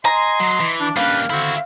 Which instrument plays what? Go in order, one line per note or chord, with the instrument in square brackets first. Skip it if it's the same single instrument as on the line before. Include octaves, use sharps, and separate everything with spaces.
[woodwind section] D#5 C6 [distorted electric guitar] G#5 [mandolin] A#5
[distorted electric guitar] F#3
E3
[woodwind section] D4
[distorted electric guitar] G3 A#3 [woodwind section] C#4 D4 B4 [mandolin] F5
[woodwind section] D3 D#3 C4 [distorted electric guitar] E4 F#4